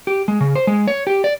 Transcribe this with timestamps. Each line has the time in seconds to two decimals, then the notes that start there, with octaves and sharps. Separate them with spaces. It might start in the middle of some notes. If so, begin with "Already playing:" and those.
0.07 G4
0.28 G#3
0.41 C#3
0.55 C5
0.67 G#3
0.88 C#5
1.07 G4
1.24 D5